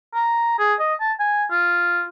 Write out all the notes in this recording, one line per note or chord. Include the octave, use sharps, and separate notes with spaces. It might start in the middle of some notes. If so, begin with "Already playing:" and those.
A#5
G#4
D#5
A5
G#5
F4